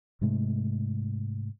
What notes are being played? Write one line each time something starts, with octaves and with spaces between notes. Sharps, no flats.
G#2 C3 G#3 A3